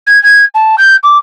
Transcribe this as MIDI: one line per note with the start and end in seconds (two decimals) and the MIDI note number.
0.07 0.21 92
0.23 0.45 92
0.55 0.76 81
0.78 0.96 91
1.03 1.18 86